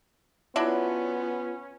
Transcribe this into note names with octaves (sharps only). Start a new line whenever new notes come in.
F#3 B3 C#4 D4 E4 F4